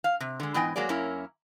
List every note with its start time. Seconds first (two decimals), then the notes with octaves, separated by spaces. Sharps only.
0.04 F5
0.20 C3
0.40 D3 G#3
0.54 G#2 E3 B3 D#5 G5 G#5
0.76 F#3 G#3 A#3 G#4 D5
0.89 F#2 A#3 C#4 E4 A#4